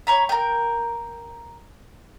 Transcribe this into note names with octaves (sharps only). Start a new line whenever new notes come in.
C#5 A#5 B5
A#4 G5